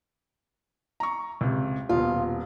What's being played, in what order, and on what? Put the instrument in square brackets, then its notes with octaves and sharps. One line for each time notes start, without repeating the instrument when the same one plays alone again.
[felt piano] A#5 C#6
C#2 C3
[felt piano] D#1 B2 [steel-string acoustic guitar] F4